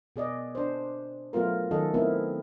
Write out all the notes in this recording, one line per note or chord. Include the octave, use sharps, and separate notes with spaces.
B2 G#4 D5 D#5
D4 C5
F#3 A3 B3 F4 A#4
D#3 F#3 C#4 A4 D#5
A3 B3 C4 E4 A#4